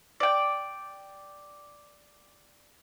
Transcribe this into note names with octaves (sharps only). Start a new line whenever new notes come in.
D5 G5